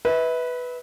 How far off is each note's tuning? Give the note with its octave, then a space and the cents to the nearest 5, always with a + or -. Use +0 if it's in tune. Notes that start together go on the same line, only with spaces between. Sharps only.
B4 +0 E5 -35